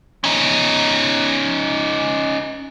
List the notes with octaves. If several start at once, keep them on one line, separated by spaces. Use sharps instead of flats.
C#4 D#4